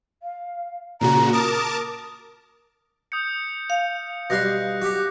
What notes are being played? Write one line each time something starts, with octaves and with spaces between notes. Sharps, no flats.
F5
A#2 C#3 F#4 A#5
A#4 A5 D6 D#6
D#6 G6 C#7
F5
B2 G3 C6 F#6 A#6
F#4 G4